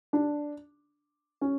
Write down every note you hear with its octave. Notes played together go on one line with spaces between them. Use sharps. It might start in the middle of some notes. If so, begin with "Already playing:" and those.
D4
C#4